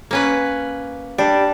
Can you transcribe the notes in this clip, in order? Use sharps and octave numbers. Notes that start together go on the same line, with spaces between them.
A#3 C#4 B4
G3 D4